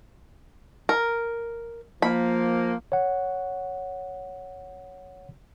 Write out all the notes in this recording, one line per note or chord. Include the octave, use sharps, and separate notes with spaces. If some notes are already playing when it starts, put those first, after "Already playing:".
A#4
F3 A#3 B5
C#5 F#5